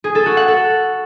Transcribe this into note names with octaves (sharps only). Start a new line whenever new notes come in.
G#4
A4
F#4
F#5
A4